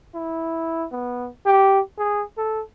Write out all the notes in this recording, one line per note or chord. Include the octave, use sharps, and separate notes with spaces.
E4
B3
G4
G#4
A4